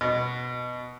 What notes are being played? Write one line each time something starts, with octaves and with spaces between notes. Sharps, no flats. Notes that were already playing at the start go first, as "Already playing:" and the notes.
B2